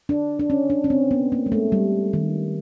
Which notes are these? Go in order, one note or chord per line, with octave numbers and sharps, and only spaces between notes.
D4
D4
C#4
D4
C#4
C4
B3
A#3
G#3
A3
G3
D#3